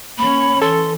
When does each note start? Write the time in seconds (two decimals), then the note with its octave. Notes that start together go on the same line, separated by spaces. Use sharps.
0.18 A#3 C#4 C#5 B5
0.62 E3 A4 C6